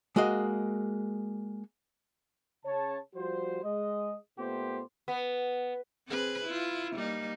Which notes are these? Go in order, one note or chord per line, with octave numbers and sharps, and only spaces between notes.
G#3 A#3 F#4 G#4 D#5
C#3 C#5 A5
F3 G3 F#4 C5
G#3 D#5
A#2 A3 B3 G4 C5
B3
C4 G#4 B4
E4 F4
G3 A#3 D#4